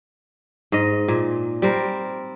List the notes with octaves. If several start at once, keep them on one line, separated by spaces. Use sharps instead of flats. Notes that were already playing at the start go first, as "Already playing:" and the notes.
G#2 D#5
A#2
G3 C4 A#4